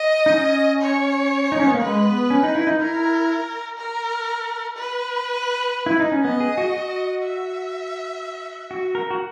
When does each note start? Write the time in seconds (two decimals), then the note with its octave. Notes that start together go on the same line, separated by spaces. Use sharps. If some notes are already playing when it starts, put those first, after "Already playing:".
Already playing: D#5
0.26 D#4
0.33 C#4
0.82 C#5
1.52 D#4
1.59 C#4
1.67 B3
1.74 A#3
1.81 G#3 B4
2.06 B3
2.30 C#4
2.43 D#4
2.55 E4
2.67 D#4
2.80 E4 A#4
3.78 A#4
4.76 B4
5.86 E4
6.00 D#4
6.12 C#4
6.25 B3 D#5
6.40 G#4
6.58 F#4
6.74 F#4
7.23 E5
8.71 F#4
8.95 A#4
9.10 F#4